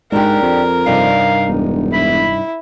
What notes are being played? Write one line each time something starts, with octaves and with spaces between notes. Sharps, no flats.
G#2 D4 G4 A#4
F2
G2 C3 D#4 F5
E1
E4 B5